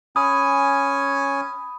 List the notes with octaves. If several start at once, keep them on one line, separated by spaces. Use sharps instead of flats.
C#4 G#5 B5 D#6